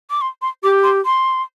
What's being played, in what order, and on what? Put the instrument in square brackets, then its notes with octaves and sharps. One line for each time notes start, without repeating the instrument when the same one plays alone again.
[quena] D6
C6
C6
[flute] G4 [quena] D6
[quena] C6
C6